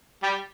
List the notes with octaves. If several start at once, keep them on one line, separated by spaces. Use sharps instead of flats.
G3 G4